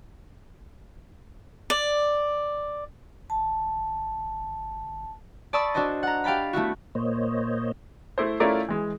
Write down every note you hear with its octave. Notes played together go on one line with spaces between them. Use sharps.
D5
G1 A5
D5 A5 B5 C#6 D#6 E6
D4 F#4 A4 C5 D#5
F#5 A#5
G4 F5 G5 A5 B5
A3 B3 E4 F#4
A#2 A#3 C5 C#5 D#5
A3 E4 C5
A3 C#4 E4 F4 A#4 D5
E3 G#3